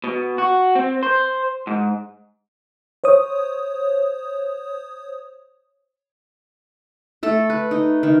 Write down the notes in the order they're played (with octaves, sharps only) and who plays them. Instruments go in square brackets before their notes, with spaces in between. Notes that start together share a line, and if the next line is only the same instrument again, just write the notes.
[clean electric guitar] B2
F#4
C4
C5
G#2
[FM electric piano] C5 C#5 D#6
[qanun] A3 A4
B4
D#4
D#3